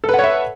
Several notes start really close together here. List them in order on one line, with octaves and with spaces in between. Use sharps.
A4 B4 F#5 C#5 E5